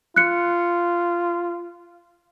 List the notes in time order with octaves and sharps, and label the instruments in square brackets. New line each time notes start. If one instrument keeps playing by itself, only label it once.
[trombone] F4 [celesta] F#6 C#7